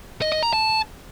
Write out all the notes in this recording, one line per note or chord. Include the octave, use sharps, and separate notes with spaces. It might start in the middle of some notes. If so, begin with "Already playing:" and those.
D#5
D#5
A#5
A5